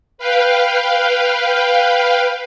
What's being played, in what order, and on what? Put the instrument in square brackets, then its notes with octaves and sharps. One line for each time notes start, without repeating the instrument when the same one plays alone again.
[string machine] B4 F5 G5